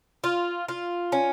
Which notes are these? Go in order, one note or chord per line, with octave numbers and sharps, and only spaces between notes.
F4
F4
C#4